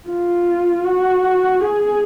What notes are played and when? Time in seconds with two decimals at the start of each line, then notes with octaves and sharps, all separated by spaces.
0.09 F4
0.85 F#4
1.60 G#4